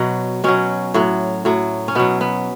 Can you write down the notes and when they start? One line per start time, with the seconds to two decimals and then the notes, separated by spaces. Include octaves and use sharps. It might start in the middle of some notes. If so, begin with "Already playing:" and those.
Already playing: B2 F#3
0.44 B2 F#3 C#4
0.94 A2 F#3
1.45 A2 F#3
1.88 C#4
1.95 B2 F#3 B3
2.21 B3